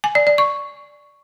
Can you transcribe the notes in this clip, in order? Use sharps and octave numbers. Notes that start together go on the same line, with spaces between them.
G#5
D5
D5
C#6